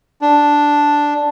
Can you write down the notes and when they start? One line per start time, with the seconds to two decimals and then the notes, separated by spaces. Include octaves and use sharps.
0.21 D4